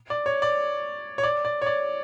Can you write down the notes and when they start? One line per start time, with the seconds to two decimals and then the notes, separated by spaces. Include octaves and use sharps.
0.10 D5
0.26 C#5
0.42 D5
1.18 C#5
1.23 D5
1.45 D5
1.62 C#5
1.66 D5